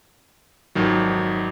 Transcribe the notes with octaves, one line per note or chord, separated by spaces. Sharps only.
G#1 F2 D#3 F#3